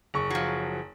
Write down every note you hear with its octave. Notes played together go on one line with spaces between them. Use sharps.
F#1 C#6
F3 F#3